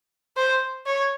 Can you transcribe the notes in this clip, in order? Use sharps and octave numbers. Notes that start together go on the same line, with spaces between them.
C5
C#5